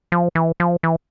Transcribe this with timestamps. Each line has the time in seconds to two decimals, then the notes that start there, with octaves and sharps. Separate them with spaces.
0.12 F3
0.35 E3
0.60 F3
0.83 E3